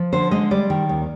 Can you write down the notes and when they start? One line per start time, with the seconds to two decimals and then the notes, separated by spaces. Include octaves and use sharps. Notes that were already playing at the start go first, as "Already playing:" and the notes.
Already playing: F3
0.13 D3 C5
0.31 G#3 D#5
0.51 G3 D5
0.70 D#3
0.89 D#2